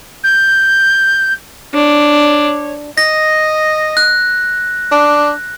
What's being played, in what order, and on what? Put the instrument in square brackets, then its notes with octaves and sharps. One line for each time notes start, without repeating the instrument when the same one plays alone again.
[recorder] G6
[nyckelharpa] D4 [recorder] C#5
[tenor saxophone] D#5 [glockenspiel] A#6
[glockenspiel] F#6
[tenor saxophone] D4